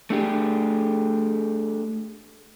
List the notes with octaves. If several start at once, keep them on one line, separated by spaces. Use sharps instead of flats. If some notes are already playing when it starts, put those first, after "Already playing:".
A3 D4 G4 G#4